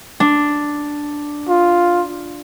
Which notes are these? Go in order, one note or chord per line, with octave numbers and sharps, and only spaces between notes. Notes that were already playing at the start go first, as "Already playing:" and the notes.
D4
F4